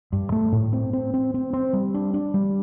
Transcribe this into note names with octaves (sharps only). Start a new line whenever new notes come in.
G2
A3
A2
C4
C4
C4
C4
C4
G3
D4
D4
G3